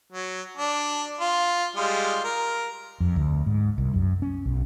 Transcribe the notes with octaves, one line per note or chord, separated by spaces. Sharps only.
F#3
D4
F4
G3 G#3 F4
A#4
F2
D2
G#2
C2
F#2
C#4
B1